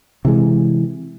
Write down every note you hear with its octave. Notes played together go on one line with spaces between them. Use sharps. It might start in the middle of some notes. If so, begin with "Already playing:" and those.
C3 E3 G#3